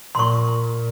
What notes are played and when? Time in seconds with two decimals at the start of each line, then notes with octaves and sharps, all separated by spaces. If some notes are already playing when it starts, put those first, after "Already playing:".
0.15 A#2 C6 C#6